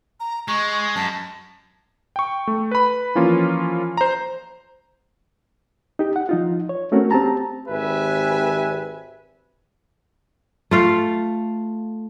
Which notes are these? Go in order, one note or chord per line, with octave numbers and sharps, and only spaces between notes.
A#5
G#3 C#6
F#2 A5
G5 C#6
A3
B4 B5
E3 F3 A#3 C#4 F4
C5 A#5
D#4 G4
F#5
F3 D#4 F4
C#5
A3 C4 C#4 F#4 A#4
C4 G4 A5 A#5
G#1 C4 G4 B4 E5 G#5
A3 F4 F5